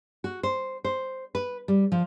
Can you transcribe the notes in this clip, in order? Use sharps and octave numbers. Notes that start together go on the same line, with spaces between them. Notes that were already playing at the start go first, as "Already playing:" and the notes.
F#4
C5
C5
B4
G3
F3